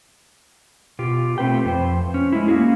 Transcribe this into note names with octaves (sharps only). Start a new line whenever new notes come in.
B2 F4 G4
A3 C4 B4 G5
F2 C5
C#4
G#3 E4
A#3 C#4 F#4 G#4